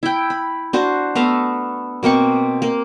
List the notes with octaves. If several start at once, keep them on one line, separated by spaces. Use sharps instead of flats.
E4 G5
B5
D4 F#4 C5
A3 B3 F5 A#5
B2 A#3 C4 C#6
A#3